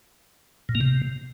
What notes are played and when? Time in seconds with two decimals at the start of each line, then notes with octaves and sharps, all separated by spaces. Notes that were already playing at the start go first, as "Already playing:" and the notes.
0.69 A#2
0.75 A#3
0.81 C3